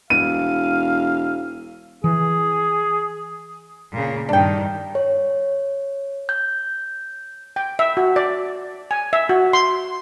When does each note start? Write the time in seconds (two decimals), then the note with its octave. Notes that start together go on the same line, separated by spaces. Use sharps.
0.10 E1 F5 D#7
2.04 E3 G#4
3.92 A#2 C#3
4.29 G2 D#3 D4 G5
4.95 C#5
6.29 G6
7.56 G5
7.79 E5
7.97 F#4
8.16 D5
8.91 G#5
9.13 E5
9.29 F#4
9.53 C6